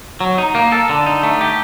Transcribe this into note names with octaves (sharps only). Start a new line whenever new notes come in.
F#3
D#4
A#3
A4
D3
D#4
A3
G4